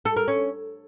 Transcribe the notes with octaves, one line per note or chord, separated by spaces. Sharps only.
A4
A#4
C#4